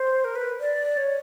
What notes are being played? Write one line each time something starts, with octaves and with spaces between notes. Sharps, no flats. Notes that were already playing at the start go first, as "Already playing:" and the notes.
Already playing: C5
A#4
B4
D5
C#5